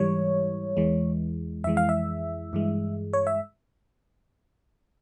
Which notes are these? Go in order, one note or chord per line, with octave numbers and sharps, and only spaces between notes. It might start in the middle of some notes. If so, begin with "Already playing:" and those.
Already playing: G#2 E3 G3 C#5
E2 E3 G#3
F2 E3 G#3 E5
F5
E5
G2 E3 G#3
C#5
E5